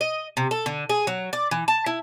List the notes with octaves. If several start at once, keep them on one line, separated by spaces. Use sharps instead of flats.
D#5
C3
A4
D3
G#4
F#3
D5
E3
A5
E4